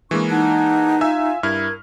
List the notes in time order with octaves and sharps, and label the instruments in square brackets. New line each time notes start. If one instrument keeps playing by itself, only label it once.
[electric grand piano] E3 G#3 A#3 [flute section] D4 C#6
[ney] D#4 [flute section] F#5 A5 F#6
[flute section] F4 F5 [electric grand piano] E5 G#5 E6
[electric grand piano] G2 E4 F6 [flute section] A#4 G#6